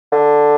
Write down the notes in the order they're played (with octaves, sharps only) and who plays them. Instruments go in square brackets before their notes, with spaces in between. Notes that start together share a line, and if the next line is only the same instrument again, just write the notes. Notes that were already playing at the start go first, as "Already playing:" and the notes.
[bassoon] D3